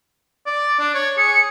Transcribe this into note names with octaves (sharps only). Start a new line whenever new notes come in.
D5
D4
C#5
G#4 C#7